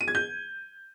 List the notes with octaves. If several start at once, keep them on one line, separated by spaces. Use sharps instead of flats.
D#7
G#6
G6